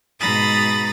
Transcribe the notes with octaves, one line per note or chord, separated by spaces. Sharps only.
G#2 B2 A#5 B5 D#6 A6